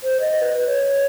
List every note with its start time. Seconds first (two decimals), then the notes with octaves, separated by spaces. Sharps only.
0.03 C5
0.20 D#5
0.40 B4
0.66 C#5